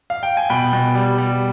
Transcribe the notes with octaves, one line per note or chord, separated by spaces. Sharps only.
F5
G5
G#5
B2 G5 B5
B2
G3
G3